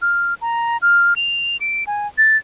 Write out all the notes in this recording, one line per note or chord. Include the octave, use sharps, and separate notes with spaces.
F6
A#5
F6
F7
D7
G#5
A6